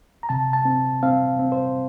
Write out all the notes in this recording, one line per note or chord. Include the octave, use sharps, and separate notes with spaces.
A#5
C3 A5
A5
C4
C4 F5
C4
C5